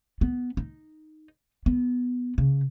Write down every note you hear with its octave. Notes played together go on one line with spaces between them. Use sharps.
B3
D#4
B3
C#3